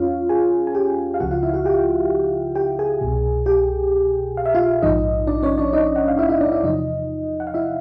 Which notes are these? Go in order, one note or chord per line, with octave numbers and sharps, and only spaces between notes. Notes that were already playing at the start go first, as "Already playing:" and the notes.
Already playing: E2 C#4 F4 C#5 F5
G#4 G#5
G#5
G4 G5
F5
C#2 C#3 F3 F#4 F#5
F4 F5
E4 E5
F5
F#4 F#5
G4 G5
G4 G5
G#4 G#5
C2 B2
G4 G5
F5
E5
F4 F5
A#1 G#2 F3 D#4 D#5
D4 D5
C#4 C#5
D4 D5
D#4 D#5
F#5
F5
E4 E5
E4 E5
D4 D5
E4 E5
E2 C3 F3 D#4 D#5
F#5
F5
E4 E5